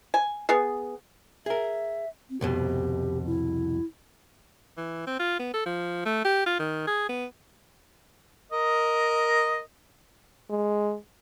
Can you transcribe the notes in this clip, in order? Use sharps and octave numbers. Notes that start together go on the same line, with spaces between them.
G#5
B3 G#4
G#4 A#4 E5
C4
C2 F2 B2 G4
E4
E3
C4
F4
B3
A4
F3
A3
G4
F4
D#3
G#4
B3
A#4 D#5
G#3